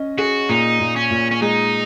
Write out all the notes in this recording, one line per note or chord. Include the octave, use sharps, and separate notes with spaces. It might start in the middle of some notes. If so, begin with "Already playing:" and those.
Already playing: C#4 D#5
F#4 G#4
A#2 D#4
A#2
C#4
A#2
C#4
G#3 D#4